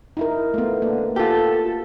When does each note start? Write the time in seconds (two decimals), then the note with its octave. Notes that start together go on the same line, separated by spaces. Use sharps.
0.17 D#4 E4 A#4
0.54 A3 B3 F4
0.82 D3 A#3
1.16 F4 G4 A4